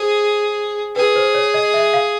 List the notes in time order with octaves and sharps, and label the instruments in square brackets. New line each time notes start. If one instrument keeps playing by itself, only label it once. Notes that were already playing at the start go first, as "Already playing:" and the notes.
Already playing: [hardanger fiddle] G#4 [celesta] C5
[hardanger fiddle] G#4 [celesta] B4
[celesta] C5
C#5
D#5
E5
F5